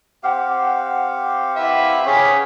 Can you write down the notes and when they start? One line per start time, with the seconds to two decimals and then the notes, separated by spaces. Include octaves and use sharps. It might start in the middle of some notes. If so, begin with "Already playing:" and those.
0.23 C4 G4 F5 F#5
1.56 B4 E5
2.06 C#4 G#4 C#5 B6